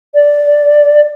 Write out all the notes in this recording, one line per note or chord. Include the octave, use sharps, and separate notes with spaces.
D5